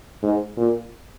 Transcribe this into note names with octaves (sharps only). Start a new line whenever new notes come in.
G#2
A#2